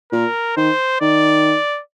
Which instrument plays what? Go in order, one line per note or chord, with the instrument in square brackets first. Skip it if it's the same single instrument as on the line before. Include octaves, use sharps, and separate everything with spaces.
[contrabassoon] A#2 [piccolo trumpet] A#4
[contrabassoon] D#3 [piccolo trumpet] C5
[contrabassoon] D#3 [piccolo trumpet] D5